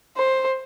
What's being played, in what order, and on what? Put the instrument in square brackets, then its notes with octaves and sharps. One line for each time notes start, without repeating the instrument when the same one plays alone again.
[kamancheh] C5